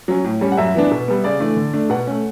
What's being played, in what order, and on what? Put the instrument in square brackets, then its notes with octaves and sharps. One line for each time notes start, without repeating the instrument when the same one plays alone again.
[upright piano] F#3 C#4
A2
G3 C#4
F#5
F#2 E5
E3 B3 D4
B2
G3 B3
C#3 D5
E3 A3 D4
D3
A3 D4
B2 F#5
A3 C#4